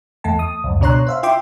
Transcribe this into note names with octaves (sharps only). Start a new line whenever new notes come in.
E2 A3 A5
D#6
C#2 F#2
B2 D4 C#5 A#5 C6 F#6
C5 E5 F5
F4 E5 G5 C6 D6